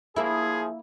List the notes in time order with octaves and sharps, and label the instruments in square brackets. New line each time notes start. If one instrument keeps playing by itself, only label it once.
[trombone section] F3 G#4 [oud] A#3 E4